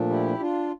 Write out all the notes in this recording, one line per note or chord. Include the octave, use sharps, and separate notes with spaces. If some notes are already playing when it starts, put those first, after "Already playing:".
Already playing: A#2 F3 A3 D4
E4 G4
D4 F4